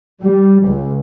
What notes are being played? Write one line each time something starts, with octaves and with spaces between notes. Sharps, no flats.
G3
C#2